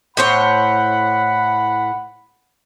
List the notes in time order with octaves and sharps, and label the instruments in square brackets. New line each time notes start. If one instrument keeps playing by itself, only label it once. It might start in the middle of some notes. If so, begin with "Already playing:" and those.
[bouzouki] A2 C5 C#5 [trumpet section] F#5 B5